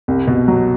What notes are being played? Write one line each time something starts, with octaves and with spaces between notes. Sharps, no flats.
C2
B2
F#3